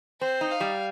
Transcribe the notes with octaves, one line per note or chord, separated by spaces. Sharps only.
C4 C5
D#4
F5
G3